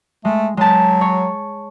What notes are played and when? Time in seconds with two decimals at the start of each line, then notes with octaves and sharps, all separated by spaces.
0.25 G#3 A3
0.57 F#3 G#3 A5
1.01 C#5